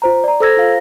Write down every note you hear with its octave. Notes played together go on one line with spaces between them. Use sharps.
F4 C5 A#5
D5 A#5
A4 C5 A#5 E6 G#6 A#6
F4 F5